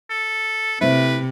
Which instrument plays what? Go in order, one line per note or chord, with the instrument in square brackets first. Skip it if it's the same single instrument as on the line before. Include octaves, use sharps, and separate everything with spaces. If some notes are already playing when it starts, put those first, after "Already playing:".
[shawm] A4
[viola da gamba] C3 [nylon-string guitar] A3 C4 E4 [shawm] B4